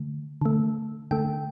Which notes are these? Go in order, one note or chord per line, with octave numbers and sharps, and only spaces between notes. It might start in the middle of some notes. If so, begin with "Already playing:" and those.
Already playing: D3 A3
D3 A3
D3 A3 G5